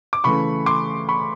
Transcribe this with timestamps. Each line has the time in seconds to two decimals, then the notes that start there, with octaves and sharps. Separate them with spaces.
0.13 D6
0.24 C#3 E3 A3 B5 C#6
0.66 C6 D6
1.09 B5 C#6